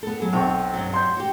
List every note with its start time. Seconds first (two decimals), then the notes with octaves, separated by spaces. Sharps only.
0.03 B3 A4
0.20 F#3 G#4
0.33 B1 C4 F5 C#6
0.74 G2 F#3
0.93 C6 G6
1.17 F#4 G4